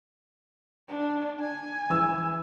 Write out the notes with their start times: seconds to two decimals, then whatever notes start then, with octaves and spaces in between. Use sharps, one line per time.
0.88 D4
1.41 G#5
1.90 E3 E6